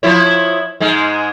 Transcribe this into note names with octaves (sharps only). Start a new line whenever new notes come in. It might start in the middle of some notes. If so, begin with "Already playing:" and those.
F3 E4 C#5
G#2 G#3